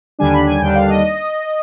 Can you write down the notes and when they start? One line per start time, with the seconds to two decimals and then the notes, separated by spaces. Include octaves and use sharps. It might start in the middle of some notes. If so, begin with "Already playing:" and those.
0.19 D#2 D3 G3 D4 G#5
0.33 B5
0.47 G#5
0.61 D#2 D3 G3 D4 G5
0.75 F5
0.89 D#5